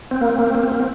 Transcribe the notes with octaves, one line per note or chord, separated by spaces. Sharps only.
C4
A#3
C4
A#3
C4
A#3
C4
A#3
C4